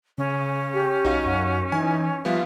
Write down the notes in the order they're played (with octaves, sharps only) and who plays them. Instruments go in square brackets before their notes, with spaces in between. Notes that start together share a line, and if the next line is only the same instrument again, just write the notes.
[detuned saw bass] C#3 [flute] C#4
[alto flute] G4
[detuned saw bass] B1 [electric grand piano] D#4 F#4 F5
[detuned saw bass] F#2 [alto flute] F#5
[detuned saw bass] E3 [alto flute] D#4 [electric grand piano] G#5
[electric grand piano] F3 G3 B3 [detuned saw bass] F4 [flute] E5 [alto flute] F5